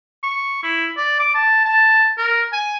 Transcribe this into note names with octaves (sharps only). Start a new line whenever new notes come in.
C#6
E4
D5
D6
A5
A5
A#4
G#5